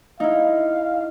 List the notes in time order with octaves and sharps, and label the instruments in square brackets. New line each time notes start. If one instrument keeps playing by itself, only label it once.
[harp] D#4 E4 [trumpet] F5